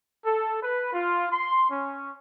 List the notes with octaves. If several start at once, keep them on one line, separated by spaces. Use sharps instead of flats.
A4
B4
F4
C6
C#4